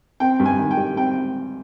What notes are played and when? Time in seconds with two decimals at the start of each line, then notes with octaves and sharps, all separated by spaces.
0.20 C4 G5
0.40 G2
0.46 G#5
0.59 D#3
0.71 G5
0.77 G3
0.97 C4 G5